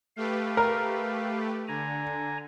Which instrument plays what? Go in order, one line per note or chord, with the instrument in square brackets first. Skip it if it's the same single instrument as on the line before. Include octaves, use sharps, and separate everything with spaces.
[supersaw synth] A3 G4 B4 [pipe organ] F5
[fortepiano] A#4
[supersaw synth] D3 [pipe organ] G#5 A#5